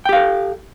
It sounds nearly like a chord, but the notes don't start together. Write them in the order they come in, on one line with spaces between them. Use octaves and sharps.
G5 G4 F5 A4